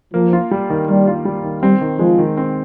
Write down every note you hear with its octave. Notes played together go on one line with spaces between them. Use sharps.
F3 A#3
F4
G3
D#3
G3 A#3
F4
G3
D#3
G3 C4
D#3
F3 G#3
D#3
C4